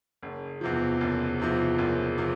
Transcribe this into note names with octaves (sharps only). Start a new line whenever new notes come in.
F#1
E2 C3 F3
F#1
E2 C3 F3
F#1
C3 F3